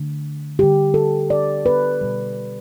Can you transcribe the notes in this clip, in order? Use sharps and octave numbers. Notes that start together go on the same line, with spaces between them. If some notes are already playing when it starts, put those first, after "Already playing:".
Already playing: D3 A3
D3 G3 G4
A4
D5
B4
B2 G3